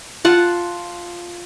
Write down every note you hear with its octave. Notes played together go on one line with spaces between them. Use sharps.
F4 F#5 A5